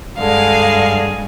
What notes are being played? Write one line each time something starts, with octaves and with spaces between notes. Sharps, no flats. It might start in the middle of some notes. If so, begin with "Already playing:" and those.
G2 D3 G#3 G#4 F5